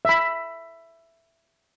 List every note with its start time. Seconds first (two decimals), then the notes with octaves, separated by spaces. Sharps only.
0.05 E5 B5